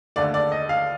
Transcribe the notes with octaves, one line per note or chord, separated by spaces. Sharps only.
D#2 D3 A3 D5
D5
D#5
F5